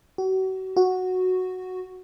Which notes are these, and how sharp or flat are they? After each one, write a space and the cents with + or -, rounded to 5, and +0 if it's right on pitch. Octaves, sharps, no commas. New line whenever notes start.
F#4 +35
F#4 -5